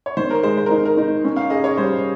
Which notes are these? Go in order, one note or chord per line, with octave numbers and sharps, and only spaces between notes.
C#5
D#3 C5
A#4
G#3 C5
C5
D#4 A#4
A#4
D#4
C#4
F5
G#4 D#5
C#5
G3 C5